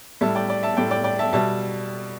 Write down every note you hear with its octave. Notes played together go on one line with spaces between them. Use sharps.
A2 G3 E5 A5
D5 G5
D5 G5
E5 A5
A2 G3 D5 G5
D5 G5
D5 G5
E5 A5
B2 G3 E5 A5